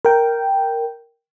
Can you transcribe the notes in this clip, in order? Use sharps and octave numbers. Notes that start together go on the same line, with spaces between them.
A#4 G5